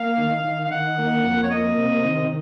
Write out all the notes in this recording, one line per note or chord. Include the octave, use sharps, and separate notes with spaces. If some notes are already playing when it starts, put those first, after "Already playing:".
Already playing: A#3 F5
D#3
D#3
F5
D#3 F#5
A#3
F2
C#5
A#3 D#5
C3
D#3